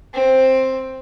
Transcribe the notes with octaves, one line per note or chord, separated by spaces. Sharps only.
C4